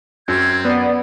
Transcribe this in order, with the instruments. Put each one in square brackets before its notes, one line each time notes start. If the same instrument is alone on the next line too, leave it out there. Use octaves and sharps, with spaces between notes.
[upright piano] F#2 [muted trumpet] C4 [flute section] G#6
[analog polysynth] B3 [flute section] D5